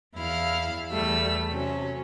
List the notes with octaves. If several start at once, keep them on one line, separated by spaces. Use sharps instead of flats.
E2 E4 F5 F6
E2 G3 A3 E6
C3 F#3 C#4